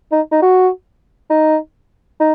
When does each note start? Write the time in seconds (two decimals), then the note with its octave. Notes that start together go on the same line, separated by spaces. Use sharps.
0.12 D#4
0.31 D#4
0.42 F#4
1.30 D#4
2.20 D#4